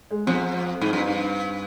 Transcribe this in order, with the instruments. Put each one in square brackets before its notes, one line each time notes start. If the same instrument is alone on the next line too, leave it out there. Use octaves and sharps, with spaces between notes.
[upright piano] G#3
[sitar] F2 [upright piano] C4
[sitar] G#2
G2